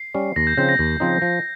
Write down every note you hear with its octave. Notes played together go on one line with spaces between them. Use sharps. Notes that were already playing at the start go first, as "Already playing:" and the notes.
Already playing: C7
G3 C#4
D#2 A#6
G6
C#3 F3 C4 D#4 G6
A#6
D#2
C#3 F3 C4 D#4
F3